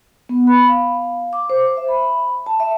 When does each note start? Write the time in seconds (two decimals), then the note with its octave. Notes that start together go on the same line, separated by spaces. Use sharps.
0.29 B3
0.47 B5
0.68 F5
1.33 D6
1.50 C5
1.77 E5
1.88 B5
2.46 A5
2.60 E5